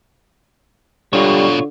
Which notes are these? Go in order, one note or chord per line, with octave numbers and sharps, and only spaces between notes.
G#2 B2 D3 G3 F4 C#5